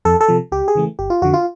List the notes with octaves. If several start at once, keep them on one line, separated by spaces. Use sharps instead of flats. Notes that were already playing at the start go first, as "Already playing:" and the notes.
F2 A4
A4
C3 F3
C#2 G4
G#4
C#3 E3 A3
G1 G4
F4
F2 D3 F#4
F4